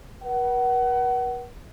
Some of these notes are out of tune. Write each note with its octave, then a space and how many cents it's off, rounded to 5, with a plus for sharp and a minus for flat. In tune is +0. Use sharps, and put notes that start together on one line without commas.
B4 -45 F#5 +30